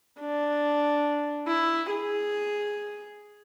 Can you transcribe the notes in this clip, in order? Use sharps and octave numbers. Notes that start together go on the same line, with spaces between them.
D4
E4
G#4